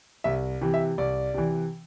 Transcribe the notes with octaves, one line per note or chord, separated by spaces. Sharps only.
C2 E5
C3 E3
E5
C2 D5
C3 E3